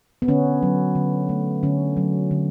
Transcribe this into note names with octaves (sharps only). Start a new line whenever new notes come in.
B3
D3 C#4
F#3
D3
A3
D3 C#4
F#3
D3